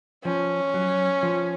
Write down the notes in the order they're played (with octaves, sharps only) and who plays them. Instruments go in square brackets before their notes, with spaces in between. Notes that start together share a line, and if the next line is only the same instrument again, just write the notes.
[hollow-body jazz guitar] F3 [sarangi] C#4
[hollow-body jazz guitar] F#3
F3